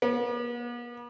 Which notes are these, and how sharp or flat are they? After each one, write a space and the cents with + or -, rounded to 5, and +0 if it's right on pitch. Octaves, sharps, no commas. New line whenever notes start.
B3 -45